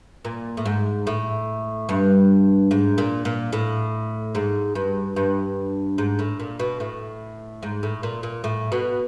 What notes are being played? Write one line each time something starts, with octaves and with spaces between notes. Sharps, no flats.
A#2
A2
G#2
A2
G2
G#2
A#2
A#2
A2
G#2
G2
G2
G#2
A2
A#2
B2
A2
G#2
A2
A#2
A#2
A2
B2